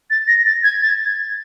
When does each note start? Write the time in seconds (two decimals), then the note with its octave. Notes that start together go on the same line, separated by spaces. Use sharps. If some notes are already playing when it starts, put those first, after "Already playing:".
0.10 A6
0.28 A#6
0.46 A6
0.64 G#6
0.82 A6
1.05 G#6